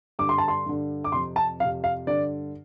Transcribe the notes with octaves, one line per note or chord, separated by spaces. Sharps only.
G2 D3 D6
C6
A5
C6
G2 D3
D6
F2 C3 C6
A5
F2 C3 F5
F5
G2 D3 D5